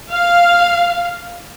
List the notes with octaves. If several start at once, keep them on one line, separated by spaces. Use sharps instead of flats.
F5